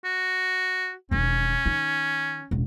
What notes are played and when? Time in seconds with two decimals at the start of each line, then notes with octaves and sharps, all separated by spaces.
0.04 F#4
1.11 E1 D#3 C#4
1.66 D#3
2.51 E1 A1